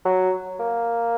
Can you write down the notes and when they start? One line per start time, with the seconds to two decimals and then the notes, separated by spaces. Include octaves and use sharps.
0.05 F#3
0.60 A#3